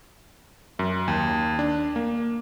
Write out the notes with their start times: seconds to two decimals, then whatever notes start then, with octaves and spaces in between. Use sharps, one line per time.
0.79 F#2
1.08 D#2
1.59 D4
1.96 A#3